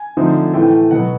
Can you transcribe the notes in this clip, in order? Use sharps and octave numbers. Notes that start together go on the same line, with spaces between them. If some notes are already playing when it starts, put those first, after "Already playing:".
Already playing: G#5
D3 F3 A3 C4 D#4
A2 E3 A3 G5
B2 F#3 B3 F#5